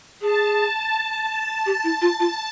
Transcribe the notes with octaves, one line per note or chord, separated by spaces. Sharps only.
G#4 A5
G4
E4
F4
F4